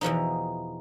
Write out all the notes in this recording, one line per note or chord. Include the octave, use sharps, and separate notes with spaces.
E2 B2 F3 D#4